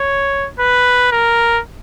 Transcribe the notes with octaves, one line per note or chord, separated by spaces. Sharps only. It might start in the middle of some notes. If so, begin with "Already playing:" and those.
Already playing: C#5
B4
A#4